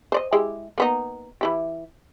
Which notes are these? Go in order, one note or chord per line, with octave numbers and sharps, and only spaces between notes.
C5 D5 D#5
G#3 E4 G4
A#3 B3 D#4
E3 E4 G4